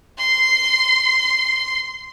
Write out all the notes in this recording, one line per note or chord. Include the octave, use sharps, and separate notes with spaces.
C6 C7